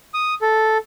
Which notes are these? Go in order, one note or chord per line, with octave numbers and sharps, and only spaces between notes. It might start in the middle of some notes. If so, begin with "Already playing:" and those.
D#6
A4